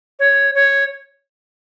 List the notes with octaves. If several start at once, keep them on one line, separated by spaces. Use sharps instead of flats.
C#5
C#5